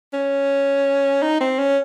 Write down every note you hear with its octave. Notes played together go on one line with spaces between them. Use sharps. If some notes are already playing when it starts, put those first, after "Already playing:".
C#4
D#4
C4
C#4